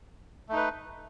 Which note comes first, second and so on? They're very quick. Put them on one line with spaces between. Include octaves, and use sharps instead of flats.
A3 D#4 B4